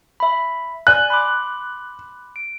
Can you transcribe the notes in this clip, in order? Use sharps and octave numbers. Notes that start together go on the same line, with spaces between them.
E5 B5
D5 G#5 F#6
B5 C6 D6
D7